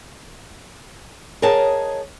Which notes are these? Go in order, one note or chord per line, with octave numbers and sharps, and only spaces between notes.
G#4 A#4 C#5 D#5 F#5 A5